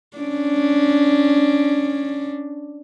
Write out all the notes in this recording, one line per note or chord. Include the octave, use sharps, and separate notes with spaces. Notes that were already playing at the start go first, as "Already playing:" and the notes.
C#4 D4